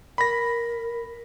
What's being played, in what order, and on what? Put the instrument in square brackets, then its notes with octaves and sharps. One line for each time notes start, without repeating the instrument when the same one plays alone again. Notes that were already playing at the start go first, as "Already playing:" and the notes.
[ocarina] A#4 [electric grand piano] B5 A#6